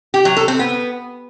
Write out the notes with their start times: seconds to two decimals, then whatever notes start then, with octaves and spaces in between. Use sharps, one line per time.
0.14 G4
0.25 F#3
0.37 A4
0.48 C4
0.59 B3